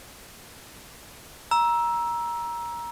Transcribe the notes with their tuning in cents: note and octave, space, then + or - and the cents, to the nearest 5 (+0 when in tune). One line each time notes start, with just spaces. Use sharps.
A#5 +20 E6 +0